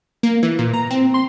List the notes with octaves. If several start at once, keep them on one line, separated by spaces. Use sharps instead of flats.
A#3
E3
A#2
A#5
C4
C6